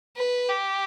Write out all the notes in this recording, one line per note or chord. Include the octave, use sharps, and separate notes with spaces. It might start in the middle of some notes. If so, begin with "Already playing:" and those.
B4
G4